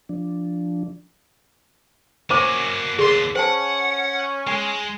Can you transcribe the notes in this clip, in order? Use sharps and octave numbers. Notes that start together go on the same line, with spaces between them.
F3 D4
A#3 C#4 F#4 C5 D6 D#7
D#2 B3 G#4 D5 C6
C#4 C5 F#5 G#5 A5
G#3 G#5